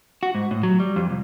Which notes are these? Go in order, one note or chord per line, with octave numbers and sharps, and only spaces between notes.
F#4
G#2
A2
F#3
G3
F2
C2